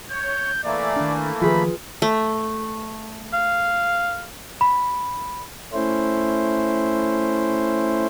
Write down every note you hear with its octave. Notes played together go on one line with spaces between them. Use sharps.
C#5 G6
E3 A3 A#3 D5
D#3 D4
D#3 F3 F4 G#4 B4 B5
A3
F5
B5
A3 C#4 E4 C5